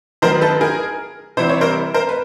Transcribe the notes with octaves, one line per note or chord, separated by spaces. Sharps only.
D#3 F#3 B3 A#4 C5
A4 B4
G#4 A#4
C3 E3 G3 C4 C5
C#5
A#4 C5
A#4 C5
B4